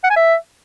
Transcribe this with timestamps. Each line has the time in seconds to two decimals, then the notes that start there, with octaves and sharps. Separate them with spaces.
0.04 F#5
0.10 G#5
0.17 E5